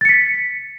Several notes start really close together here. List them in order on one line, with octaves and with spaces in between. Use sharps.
A6 C#7 B6